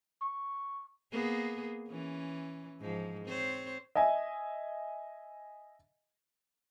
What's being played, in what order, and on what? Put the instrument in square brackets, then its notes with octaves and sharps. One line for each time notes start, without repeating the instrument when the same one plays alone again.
[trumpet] C#6
[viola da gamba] A#3 B3 G#4
E3 C#4
G#2 F3
C4 C5 C#5
[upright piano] D#5 E5 G#5